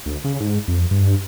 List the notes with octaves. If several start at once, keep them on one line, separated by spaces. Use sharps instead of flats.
D2
C#3
G#2
F2
G2